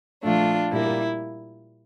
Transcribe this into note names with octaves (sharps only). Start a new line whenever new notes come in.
A#2 F3 A3 D4 F4
A#2 G3 A#3 E4